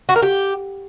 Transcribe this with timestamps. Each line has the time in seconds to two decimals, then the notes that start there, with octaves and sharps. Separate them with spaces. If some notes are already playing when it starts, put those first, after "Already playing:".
0.09 F#4
0.16 A#4
0.22 G4